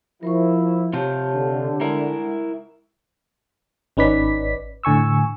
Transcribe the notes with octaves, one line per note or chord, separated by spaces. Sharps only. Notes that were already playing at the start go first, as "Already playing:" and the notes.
F3 E4 A#4 C5 C#6
C3 F4 G4 C#5 A5
D3
G#3 E4 A#4 F#5
G#1 C#4 D#4 B4 D5 B6
A2 D3 G#5 C#6 E6